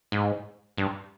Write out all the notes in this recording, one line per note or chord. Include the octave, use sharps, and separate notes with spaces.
G#2
G2